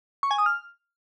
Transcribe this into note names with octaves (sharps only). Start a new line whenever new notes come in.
C#6
G#5
D#6
F6